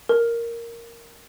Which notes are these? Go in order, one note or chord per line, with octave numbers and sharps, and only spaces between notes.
A#4